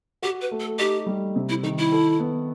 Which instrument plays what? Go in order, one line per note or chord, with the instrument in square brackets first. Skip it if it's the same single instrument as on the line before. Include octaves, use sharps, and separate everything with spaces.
[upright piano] F#4 [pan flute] G4
[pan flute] B4
[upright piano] A3
[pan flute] A4
[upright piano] D#4 [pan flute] G4
[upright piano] G3
C3
[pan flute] E4
[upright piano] D#3 [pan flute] D#4
[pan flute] E4
[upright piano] A4
B3